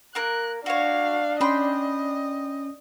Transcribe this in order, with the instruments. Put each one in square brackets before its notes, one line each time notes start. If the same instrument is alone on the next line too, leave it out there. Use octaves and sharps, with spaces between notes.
[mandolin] A#3 A#4 [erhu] F#6
[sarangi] D4 [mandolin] F#4 C#5 [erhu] F5
[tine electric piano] C#4 [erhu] D#5 [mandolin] G5 B5 C6